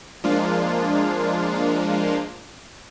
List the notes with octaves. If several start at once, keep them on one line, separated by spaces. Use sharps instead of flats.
F3 G#3 A#3 D4 F4